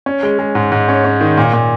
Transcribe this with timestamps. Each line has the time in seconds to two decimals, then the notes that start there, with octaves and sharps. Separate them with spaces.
0.06 C#4
0.23 G#3
0.39 G#3
0.55 G#2
0.72 G#2
0.89 C#4
1.04 C#4
1.21 D#3
1.38 A#2
1.53 A#2